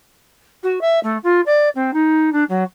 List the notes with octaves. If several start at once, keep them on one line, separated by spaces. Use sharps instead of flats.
F#4
E5
A3
F4
D5
C4
D#4
D4
F#3